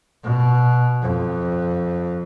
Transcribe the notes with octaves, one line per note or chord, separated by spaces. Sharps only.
B2
F2